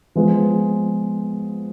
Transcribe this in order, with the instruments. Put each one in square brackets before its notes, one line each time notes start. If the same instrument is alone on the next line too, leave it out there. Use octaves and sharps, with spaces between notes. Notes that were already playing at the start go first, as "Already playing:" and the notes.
[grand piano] F3 G#3 B3